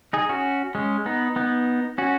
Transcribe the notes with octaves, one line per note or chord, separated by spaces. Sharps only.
D#4 G#4
C#4 F#4
G#3 C#4
B3 D#4
B3 D#4
C#4 F#4